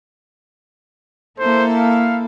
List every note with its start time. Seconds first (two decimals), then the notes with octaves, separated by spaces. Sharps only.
1.39 A#3 E4 A4 C5
1.77 F5